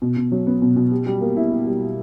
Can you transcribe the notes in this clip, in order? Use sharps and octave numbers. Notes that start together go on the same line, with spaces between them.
B2
B2
F#3
B3
B2
B2
G4
G3
A#3
E4
G4
G3